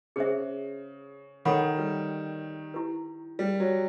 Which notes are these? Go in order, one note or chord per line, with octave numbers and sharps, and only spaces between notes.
C#3 G#4 C5 E5
D#3 A4 C#5 F#5 B5
G3
E4 G4 B4
G3
F#3